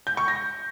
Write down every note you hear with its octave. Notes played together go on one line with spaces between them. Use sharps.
G6
C#6
A#6